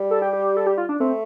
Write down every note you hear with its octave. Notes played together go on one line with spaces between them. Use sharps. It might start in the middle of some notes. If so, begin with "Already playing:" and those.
Already playing: G3
A4
G4
G4
A4
G4
F4
D4
A3 C4